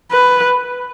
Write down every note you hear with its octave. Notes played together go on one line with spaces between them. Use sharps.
B4